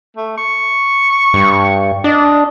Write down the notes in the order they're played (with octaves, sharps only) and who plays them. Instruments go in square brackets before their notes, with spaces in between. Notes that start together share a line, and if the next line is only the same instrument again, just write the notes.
[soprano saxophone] A3
C#6
[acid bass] G2
[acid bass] D4 [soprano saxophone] D#5